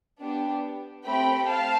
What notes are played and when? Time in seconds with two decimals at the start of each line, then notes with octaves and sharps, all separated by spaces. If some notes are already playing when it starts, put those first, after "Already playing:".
0.21 B3 D4 G4
1.05 A3 C4 G4 G5 B5
1.48 F5 A5